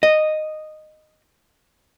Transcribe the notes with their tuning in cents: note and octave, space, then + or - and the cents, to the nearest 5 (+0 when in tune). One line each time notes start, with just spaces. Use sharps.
D#5 -10